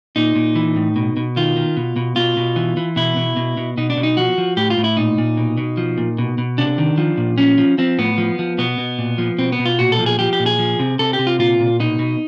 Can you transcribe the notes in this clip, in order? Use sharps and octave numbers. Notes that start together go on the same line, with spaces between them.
A#2 D#4
A#2
E3
A2
B2
B2
D#3 F4
D#3
B2
B2
B2 F4
B2
E3
E3
B2 E4
B2
B2
B2
B2 D#4
D4
B2
D#4
F3 F#4
F3
A2 G4
F4
A2
E4
A#2 D#4
A#2
B2
B2
F3
A#2
B2
B2
C3 D4
D#3
F3
A#2
F3 C#4
F3
F3 C4
A2 B3
F3
F3
B2 B3
B2
A#2
F3
B2 C4
B3
B2
F4
A#2 F#4
A4
F3
G#4
F3 G4
G4
A#2
G#4
F3
C3
C3 A4
G4
C3
F4
A#2 F4
A#2
B2 D#4
B2